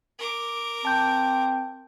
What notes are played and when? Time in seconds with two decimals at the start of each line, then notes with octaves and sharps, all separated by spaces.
0.19 A#4 D6
0.85 C4 A5 G6